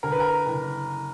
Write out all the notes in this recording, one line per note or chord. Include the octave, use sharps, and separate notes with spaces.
D3 A#4
B4
A#4
F#1